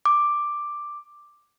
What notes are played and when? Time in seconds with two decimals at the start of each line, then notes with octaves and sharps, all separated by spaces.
0.06 D6